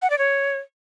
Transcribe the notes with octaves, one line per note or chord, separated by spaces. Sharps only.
F#5
D5
C#5